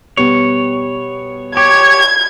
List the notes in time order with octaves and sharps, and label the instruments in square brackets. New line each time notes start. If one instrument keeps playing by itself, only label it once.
[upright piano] B2 G3 B3 [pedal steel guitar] C#5
[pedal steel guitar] G4 [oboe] C#5 [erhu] G#6